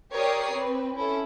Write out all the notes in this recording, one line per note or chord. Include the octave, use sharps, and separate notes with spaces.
G4 A#4 C#5 D5 D#6 C7
C4 B4
C#4 E4 A4